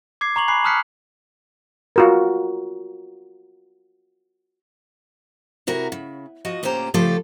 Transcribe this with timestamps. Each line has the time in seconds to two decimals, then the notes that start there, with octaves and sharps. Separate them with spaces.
0.21 D6 G#6 C7
0.36 A#5 C#6 F7 F#7
0.48 G#5 B5 D6 F#6 C7
0.64 A5 D#6 F6 F#6 B6 C#7
1.96 F4 F#4 A#4
5.67 C3 E4 F#4 A#4
5.92 C#3
6.45 F3 F#4 D#5
6.63 D2 A#2 C#4 G4 C5 A#5
6.94 C#3 F3 A3 F4 G4 A4